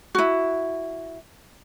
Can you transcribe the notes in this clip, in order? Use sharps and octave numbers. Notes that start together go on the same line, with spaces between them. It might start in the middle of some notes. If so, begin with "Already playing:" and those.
E4 F#4